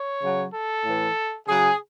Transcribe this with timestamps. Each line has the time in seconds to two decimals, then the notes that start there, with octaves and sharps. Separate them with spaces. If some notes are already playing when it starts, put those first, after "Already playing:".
Already playing: C#5
0.23 C#3 F#3
0.54 A4
0.85 A2 E3
1.48 C#3 F#3 G#4